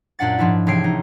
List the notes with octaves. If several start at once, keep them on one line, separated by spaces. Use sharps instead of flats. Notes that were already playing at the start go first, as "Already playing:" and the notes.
F#2 A#2 D4 F#5 A6
G#2 F3 D4 E4
A1 C3 G#4 C#5 C7 D7
D#4